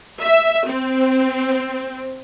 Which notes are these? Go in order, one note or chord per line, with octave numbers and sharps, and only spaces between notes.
E5
C4